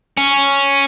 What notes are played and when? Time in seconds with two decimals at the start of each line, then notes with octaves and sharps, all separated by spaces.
0.17 C#4